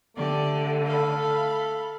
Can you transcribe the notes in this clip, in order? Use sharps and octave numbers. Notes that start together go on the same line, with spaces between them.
D3 A3 G4 D5
A4 F5 B5